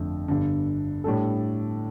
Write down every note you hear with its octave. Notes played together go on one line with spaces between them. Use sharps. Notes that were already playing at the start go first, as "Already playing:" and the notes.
Already playing: G1 F2 D3 A3
G1 G2 D3
A2 G3 D4 A4